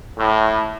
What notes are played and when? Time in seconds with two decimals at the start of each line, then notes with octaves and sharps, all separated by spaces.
0.18 A2